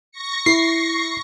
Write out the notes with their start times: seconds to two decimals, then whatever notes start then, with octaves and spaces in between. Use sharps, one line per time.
0.11 C#6 A#6 C#7
0.46 E4 C7